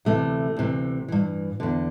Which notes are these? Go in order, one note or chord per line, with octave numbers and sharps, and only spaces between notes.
D2 C3 E3 A3
D2 C3 E3
G2 E3
E2 D3